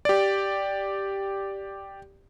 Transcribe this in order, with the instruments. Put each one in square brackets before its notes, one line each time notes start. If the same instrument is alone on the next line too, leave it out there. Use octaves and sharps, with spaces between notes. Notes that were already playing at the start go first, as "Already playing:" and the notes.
[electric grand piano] G4 D5